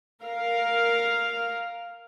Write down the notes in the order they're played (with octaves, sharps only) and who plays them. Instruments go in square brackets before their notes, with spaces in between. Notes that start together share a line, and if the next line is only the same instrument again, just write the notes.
[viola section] A#4 F5